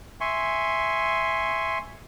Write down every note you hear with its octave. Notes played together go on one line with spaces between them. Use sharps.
E5 G#5 C6 C#6